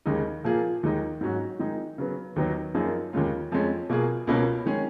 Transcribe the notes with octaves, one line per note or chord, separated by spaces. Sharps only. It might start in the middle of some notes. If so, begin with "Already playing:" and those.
D#2 C#3 G#3 D#4
A#2 F3 A#3 F4 G#4
D#2 D#3 G#3 D#4
G#2 F#3 C#4 F#4
D#3 G#3 D#4 G#4
C#3 F#3 B3
D#2 D#3 F#3 B3 D#4
F#2 F3 A#3 D#4 G#4
D#2 C#3 G#3 C#4 F4
F2 F3 G#3 C#4
B2 A#3 F4 G#4
C#2 B2 A#3 C#4
D#3 G#3 C#4 G#4